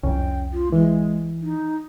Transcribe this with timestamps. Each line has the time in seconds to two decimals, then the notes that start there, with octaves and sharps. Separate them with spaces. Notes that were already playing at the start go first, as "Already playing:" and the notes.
0.03 C2 F2 C#4 G5
0.52 F4
0.72 E3 G#3
1.41 D#4